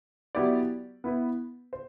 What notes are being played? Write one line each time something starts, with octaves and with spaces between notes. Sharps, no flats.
F#3 B3 E4 G4 D5
B3 E4 B4
C5